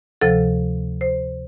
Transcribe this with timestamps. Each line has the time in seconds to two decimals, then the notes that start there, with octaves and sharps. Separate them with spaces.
0.21 D2 C3 F3 A4
1.01 C5